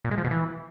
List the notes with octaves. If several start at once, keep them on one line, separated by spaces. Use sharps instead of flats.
A#2
G#3
F3
B2
E3